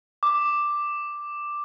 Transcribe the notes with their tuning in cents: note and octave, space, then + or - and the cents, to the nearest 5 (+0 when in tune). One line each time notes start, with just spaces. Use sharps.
D6 +5